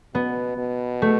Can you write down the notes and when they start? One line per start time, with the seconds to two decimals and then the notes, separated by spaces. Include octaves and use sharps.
0.15 B2 B3
0.58 B2
1.02 A3